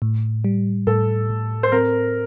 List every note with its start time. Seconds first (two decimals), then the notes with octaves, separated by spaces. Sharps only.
0.02 A2
0.44 G3
0.87 A2 A4
1.30 A2
1.63 C5
1.72 C4 A#4